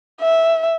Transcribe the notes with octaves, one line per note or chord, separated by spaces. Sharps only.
E5